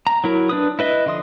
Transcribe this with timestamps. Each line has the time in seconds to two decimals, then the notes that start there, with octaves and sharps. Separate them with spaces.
0.07 A#5
0.24 F#3 E4 A#4
0.49 D4 B4 D#6
0.79 E4 B4 D#5 E5
1.06 D3 F3 C6 D#6